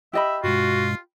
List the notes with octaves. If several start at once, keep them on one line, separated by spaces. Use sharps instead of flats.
G4 D#5 E5 B5
G2 B2 G#3 F4 F#4